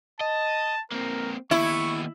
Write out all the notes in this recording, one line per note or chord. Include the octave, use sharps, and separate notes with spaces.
D#5 A5
A#3 C4 A#4
D#2 B3 E4 C#6